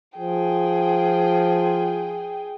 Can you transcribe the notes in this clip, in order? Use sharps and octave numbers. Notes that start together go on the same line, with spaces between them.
F3 G#4 G5